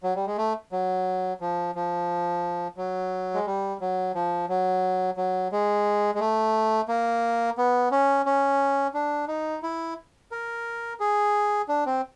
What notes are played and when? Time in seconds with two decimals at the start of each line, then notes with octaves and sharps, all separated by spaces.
0.03 F#3
0.15 G3
0.26 G#3
0.38 A3
0.72 F#3
1.41 F3
1.75 F3
2.77 F#3
3.34 G#3
3.46 G3
3.81 F#3
4.15 F3
4.49 F#3
5.17 F#3
5.52 G#3
6.15 G#3
6.20 A3
6.88 A#3
7.58 B3
7.91 C#4
8.26 C#4
8.94 D4
9.28 D#4
9.63 E4
10.32 A#4
11.00 G#4
11.69 D4
11.86 C4